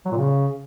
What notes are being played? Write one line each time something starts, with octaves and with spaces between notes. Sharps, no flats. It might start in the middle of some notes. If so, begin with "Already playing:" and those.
F#3
A#2
C#3